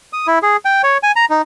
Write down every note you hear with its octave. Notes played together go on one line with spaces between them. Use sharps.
D#6
E4
G#4
G5
C#5
G#5
A#5
D#4